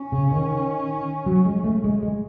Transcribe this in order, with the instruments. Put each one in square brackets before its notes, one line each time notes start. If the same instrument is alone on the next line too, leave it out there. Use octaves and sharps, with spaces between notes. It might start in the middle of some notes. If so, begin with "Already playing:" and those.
Already playing: [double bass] C#4
[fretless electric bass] C#3
D#3
F#3
G#3
A3
G#3
G#3